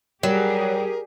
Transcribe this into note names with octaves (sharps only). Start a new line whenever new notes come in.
F#3 G3 G4 G#4 A#4